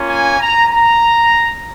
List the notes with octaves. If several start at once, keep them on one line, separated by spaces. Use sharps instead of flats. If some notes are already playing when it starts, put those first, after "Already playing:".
Already playing: A#3 C#4 F4
G#5
A#5
A#5